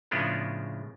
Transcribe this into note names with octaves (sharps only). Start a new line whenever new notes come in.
A2 C#3 F3 G#3 B3 D4